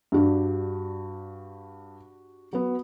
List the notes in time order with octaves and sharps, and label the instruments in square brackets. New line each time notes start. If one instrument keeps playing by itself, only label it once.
[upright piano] G2 [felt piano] D4 F#4 G4
[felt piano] F#3 B3